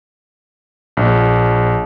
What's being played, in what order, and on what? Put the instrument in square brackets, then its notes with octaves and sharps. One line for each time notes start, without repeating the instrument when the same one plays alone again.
[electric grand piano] A#1